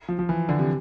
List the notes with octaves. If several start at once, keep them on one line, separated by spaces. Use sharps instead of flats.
F3
F3
E3
D3
C3